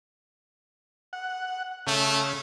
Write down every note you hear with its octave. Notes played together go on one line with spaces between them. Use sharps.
F#5
C#3 A3